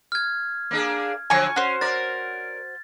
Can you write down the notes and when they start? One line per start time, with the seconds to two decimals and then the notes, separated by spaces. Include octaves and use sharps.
0.12 F6 G#6
0.71 A#3 D4 G#4
1.30 D3 F3 F#3 G#5 C#6
1.56 C#4 F#4 C5
1.81 A#4 D5 A6